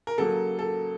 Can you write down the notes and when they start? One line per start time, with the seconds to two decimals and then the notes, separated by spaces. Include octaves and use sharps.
0.07 A#4
0.18 C#3 F#3 A#3 A4
0.59 A4